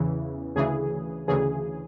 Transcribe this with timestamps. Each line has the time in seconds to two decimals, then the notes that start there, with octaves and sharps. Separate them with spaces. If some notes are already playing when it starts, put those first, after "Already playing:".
Already playing: E2 C#3 E3
0.56 D2 C#3 E3 G#4
1.28 D2 C#3 E3 G#4